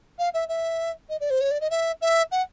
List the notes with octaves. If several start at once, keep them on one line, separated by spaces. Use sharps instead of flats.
F5
E5
E5
D#5
D5
C5
C#5
D5
D#5
E5
E5
F#5